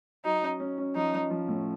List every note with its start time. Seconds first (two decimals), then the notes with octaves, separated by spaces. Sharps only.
0.25 F#3 D#4
0.41 C#4
0.60 C#4
0.78 C#4
0.95 F3 D#4
1.13 F3
1.30 F3
1.48 A2